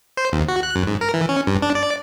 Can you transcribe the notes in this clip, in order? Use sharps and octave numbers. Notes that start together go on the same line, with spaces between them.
C5
D#2
F#4
F#6
F#2
G#2
A#4
E3
C#4
G2
D4
D5